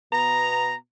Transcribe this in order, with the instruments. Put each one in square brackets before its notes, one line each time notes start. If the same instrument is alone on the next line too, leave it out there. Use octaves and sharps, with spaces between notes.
[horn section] B2 B3 A#5